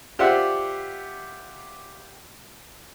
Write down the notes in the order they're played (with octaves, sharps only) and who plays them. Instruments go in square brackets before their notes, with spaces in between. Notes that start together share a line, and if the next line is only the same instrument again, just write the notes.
[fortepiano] F4 G4 C5 D5 E5 F#5